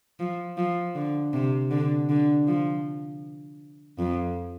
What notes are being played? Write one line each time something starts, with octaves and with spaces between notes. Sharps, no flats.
F3
F3
D3
C3
D3
D3
F3
F2